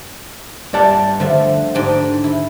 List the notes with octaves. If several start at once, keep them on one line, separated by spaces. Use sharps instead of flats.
G2 D5 E5 F#5 A5
D3 F3 A3 E5
G#2 D4 G4
E4